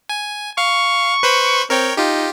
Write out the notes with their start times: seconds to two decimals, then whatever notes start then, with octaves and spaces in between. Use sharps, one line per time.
0.09 G#5
0.58 F5 C#6
1.23 B4 C5 B5
1.70 C4 A#4 C#5 G5
1.97 D#4 F4 G4